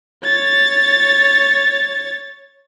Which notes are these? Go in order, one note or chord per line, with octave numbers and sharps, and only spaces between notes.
C#5 A6